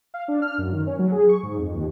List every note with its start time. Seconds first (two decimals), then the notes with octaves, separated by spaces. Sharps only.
0.14 F5
0.28 D4
0.42 F6
0.58 F#2
0.72 D#3
0.87 C#4
0.99 F#3
1.12 G#4
1.29 C#6
1.43 G#2
1.59 F2
1.75 D#2